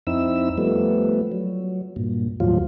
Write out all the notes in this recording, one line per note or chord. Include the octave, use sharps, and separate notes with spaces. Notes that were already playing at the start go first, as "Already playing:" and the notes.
F2 C4 D#4 E4 E6
F3 G3 A3 B3
F#3
G2 A#2
D#2 A2 F3 F#3 F4